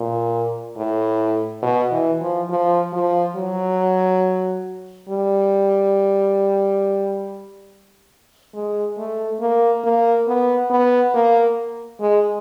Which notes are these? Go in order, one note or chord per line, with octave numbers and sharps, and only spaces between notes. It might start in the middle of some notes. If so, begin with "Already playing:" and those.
Already playing: A#2
A2
B2
E3
F3
F3
F3
F#3
G3
G#3
A3
A#3
A#3
B3
B3
A#3
G#3